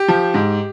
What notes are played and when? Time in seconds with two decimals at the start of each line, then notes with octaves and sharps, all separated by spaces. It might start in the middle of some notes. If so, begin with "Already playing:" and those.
Already playing: G4
0.08 F3
0.34 G#2